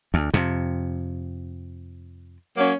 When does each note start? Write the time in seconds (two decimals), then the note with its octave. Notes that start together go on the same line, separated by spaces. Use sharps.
0.14 D2
0.34 F2 C3
2.57 F#3 A#3 C#4